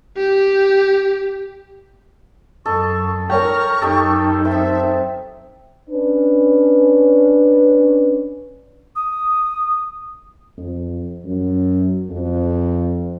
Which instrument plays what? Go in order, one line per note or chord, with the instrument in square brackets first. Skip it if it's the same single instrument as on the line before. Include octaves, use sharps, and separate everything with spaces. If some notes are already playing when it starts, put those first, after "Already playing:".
[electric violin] G4
[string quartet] F#2 [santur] A4 D#5 [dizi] C#6
[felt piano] A#4 C#5 G5 [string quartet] A#5 F6 [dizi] C#6
[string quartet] F#2 D#3 [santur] D#4 G4 A4
[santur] C4 [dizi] E5
[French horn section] C#4 D4 B4
[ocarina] D#6
[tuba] F2
F#2
F2